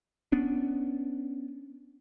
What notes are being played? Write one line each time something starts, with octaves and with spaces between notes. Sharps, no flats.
B3 C#4 D4